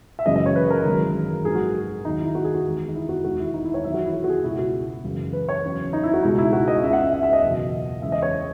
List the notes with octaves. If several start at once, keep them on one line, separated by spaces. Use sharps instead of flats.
E5
F#1 F#2 C#3 E3 G#3 D#5
D#5
C#5
B4
A#4
G#1 F#2 E3 G#3
A#1 G#2 F#3 G#4
F#4
D#2 D#3 F#3 D#4
E4
F#4
G#4
F#4
E2 D#3 G#3
D#4
E4
F#4
E1 D#2 D#3 G#3 F#4
E4
D#4
E4
C#5
E2 D#3 F#3 E5
F#4
E4
F#4
F#4
G#4
C#2 B2 G#3 E4
F#4
F#1 F#2 C#3 E3 G#3
B4
C#5
E2 C#3 F#3
D#4
E4
F#4
C#2 B2 G#3 D#4
E4
F#4
D#5
C#2 C#3 G#3 E5
F#5
E5
E5
E5
D#5
F#1 E2 B2
E2 C#3 G#3 E5
D#5
C#5